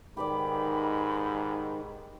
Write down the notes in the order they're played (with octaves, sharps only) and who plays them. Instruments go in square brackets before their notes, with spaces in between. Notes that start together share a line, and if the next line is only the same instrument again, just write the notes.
[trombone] G#2 [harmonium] D#3 [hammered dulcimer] G4 B4 D5 [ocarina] B5